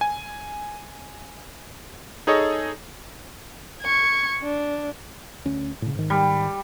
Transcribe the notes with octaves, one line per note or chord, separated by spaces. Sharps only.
G#5
D#4 G#4 A4 C#5 D#5
C#6 G#6
D4
D2 C#4
A2 C#3
G#2 D#3
G3